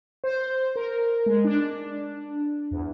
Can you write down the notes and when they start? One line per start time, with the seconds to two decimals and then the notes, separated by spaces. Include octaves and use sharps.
0.24 C5
0.76 A#4
1.26 G#3
1.45 D4
2.71 E2